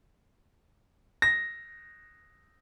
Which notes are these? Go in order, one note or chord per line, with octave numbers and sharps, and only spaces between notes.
A#6